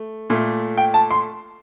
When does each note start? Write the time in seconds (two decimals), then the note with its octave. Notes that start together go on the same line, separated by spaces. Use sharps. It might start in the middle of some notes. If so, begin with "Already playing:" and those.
Already playing: A3
0.30 A#2 A3
0.78 G5
0.94 A5
1.11 C6